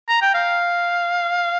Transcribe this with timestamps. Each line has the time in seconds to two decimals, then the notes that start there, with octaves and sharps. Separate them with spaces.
0.09 A#5
0.22 G5
0.35 F5